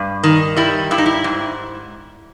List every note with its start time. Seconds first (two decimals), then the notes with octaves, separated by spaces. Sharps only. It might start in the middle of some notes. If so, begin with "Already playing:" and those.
Already playing: G2
0.23 D#3
0.57 G3 E4
0.91 G2 E4
0.98 D#4
1.06 E4
1.24 G#2